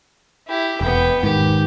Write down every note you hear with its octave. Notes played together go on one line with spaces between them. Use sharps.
E4 G4
E1 B3 G5
G#2 D#3 G4